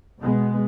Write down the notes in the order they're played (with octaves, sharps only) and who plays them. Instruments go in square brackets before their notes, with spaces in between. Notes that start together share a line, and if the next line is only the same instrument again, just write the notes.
[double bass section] B2 G#3 B3